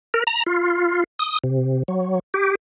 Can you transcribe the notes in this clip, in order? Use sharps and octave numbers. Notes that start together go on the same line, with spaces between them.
A#4
A#5
F4
D#6
C3
F#3
G4